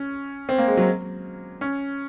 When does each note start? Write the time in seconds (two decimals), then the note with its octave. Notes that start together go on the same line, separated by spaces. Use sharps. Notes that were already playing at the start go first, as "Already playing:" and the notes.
Already playing: C#4
0.49 C4
0.59 A#3
0.68 G#3
0.77 F#3
1.61 C#4